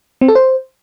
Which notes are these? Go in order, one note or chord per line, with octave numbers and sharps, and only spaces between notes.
C4
A4
C5